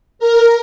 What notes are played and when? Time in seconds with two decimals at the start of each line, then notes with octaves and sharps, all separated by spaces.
0.19 A#4